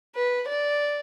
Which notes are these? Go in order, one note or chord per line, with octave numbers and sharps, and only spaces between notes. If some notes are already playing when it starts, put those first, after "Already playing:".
B4
D5